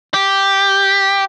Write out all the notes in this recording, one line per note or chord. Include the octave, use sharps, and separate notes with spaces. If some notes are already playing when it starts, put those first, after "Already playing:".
G4